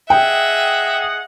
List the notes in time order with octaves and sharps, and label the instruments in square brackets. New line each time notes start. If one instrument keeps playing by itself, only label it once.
[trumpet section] G#4 D#5 F#5 [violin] E5 [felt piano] G5